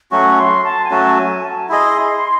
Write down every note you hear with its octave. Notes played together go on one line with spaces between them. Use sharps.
F#3 A3 C#4 F#4 C#6
C6
A5
G#5
F#3 A3 C#4 F#4 A5
G#5
G#5
A5
E4 G#4 D#5 C6